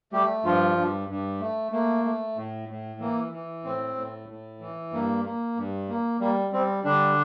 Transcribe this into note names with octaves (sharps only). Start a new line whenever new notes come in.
G3 A3 G4
G2 F3 F4
G2
G2
A3
A3 A#3
A3
A2
A2
E3 A#3
E3
A2 C4
A2
A2
E3
G2 A#3
A#3
G2
A#3
G3 A#3
G3 C4
D3 G3 D4